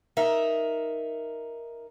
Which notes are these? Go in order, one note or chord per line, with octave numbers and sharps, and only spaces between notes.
D#4 A#4 E5